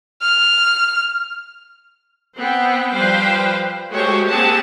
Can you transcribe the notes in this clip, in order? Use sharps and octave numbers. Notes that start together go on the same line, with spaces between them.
F6
B3 C4 G5
F3 G3 B4 C5 F5 G5
G#3 A3 F#4 G4 C5 C#5
A#3 C4 G4 G#4 F#5 A5